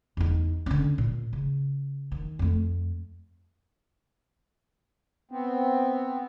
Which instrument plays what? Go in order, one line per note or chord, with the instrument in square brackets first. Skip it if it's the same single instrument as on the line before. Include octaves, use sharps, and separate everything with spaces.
[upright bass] E2 D#4
D3 C#4
A#2
C#3
D#3
F2 A3
[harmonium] B3 C4